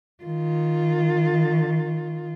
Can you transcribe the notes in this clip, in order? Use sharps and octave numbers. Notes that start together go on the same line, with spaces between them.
D#3 F4